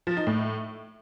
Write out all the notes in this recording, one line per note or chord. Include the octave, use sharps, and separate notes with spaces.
F3
D#4
A2